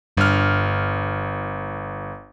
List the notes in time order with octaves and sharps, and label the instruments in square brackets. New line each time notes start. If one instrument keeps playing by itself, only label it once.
[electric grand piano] G1 F6 [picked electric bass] G2